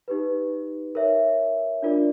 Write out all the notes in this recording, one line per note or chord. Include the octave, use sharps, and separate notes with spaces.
D#4 G4 B4
A#4 C#5 E5
D4 F4 A#4 D5